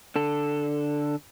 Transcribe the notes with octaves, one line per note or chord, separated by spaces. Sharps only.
D3 A4